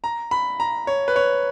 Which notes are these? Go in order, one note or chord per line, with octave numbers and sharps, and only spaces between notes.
A#5
B5
A#5
C#5
B4
C#5